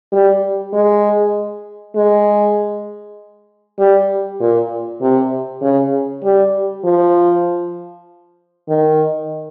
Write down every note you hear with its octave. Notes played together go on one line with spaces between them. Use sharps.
G3
G#3
G#3
G3
A#2
C3
C#3
G3
F3
D#3